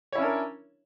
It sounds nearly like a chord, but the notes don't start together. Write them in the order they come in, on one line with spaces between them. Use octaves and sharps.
C#5 E4 C#4 D4 A#4